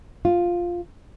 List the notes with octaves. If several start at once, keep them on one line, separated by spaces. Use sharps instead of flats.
F4